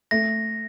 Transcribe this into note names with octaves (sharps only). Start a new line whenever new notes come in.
A3 A#6